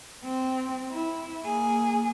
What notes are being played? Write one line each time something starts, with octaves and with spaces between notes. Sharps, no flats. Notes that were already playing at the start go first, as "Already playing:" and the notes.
C4
E4
A#3 G#4